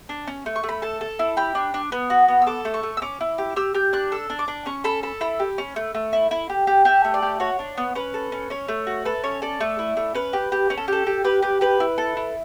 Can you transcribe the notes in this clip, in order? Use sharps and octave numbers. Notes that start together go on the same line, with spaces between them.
D4
C#4
A3
C#6
A3
B5
A4 A5
A4
E4
G4 B5
D4
D4
B3
F#4
B3
E6
A4 D6
A3
C#6
A3
E6
C#4 D6
E4
G4
G4 E6
G4 G6
D4 F#6
A4 E6
D4
D6
D4
C#4 C#6
A4 B5
A4 B5
E4 B5
G4
C#4
A3
A3
E4
E4
G4
G4
G4 E5
A3
D5
G4
F#4 C#5
D4
B3
C#4 B4
A4
C#4
C#4 C#5
A3
F#4
A4 B4
C#4 C#5
A4 D5
A3
E4
A3
C#4 B4
G4
G4
C#4 B4
A4
G4 A4
G4
G4 B4
G4 B4
G4 B4
E4
A4
E4